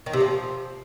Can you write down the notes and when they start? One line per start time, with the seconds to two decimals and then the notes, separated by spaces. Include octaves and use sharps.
0.06 D#3
0.13 C3
0.21 F3